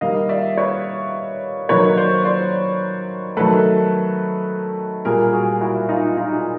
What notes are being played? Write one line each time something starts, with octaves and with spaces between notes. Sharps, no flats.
D#3 G3 A#3 D#5 F5
D5 E5
B4 C#5
D#3 F#3 A#3 B4 C#5
C5 D5
C5 D5
D#3 F#3 A3 A4 B4
A#2 G3 A#3 G#4 A#4
F#4 G#4
E4 F#4
D#4 F4
D#4 F4